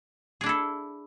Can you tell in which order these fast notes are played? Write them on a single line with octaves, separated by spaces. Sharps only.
G#4 D4 E4 A4